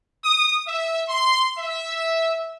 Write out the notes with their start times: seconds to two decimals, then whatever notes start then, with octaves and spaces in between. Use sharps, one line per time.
0.23 D#6
0.67 E5
1.09 C6
1.57 E5